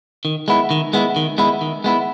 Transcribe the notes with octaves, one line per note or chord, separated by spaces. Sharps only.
D#3
G#3 B3 E4
D#3
G#3 B3 E4
D#3
G#3 B3 E4
D#3
G#3 B3 E4